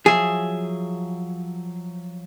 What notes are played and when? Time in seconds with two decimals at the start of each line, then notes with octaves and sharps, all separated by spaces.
0.06 F3 F#3 G#4 E5